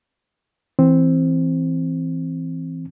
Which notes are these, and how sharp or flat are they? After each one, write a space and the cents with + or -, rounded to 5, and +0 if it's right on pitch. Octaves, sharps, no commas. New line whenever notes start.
E3 -5 C4 +0